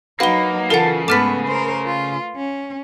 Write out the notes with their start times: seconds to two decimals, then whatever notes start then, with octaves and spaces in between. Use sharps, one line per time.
0.20 F#3 A#3 D#4 F#4 B4 F5 G7
0.70 C#3 E3 F4 A4 A#4 F#5
1.08 G#2 A3 B3 B4 D6 F6 B6
1.48 A#4 C5
1.86 F4
2.36 C#4